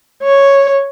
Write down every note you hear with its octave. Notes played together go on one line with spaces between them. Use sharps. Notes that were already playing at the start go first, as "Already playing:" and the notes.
C#5